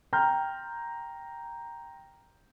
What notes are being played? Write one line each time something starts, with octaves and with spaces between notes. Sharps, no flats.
G5 A#5 C6 F6 G6